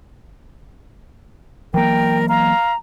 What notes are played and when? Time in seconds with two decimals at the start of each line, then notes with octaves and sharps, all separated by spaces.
1.74 E3 F#3 A#3 A#4 G5
2.29 F5 A#5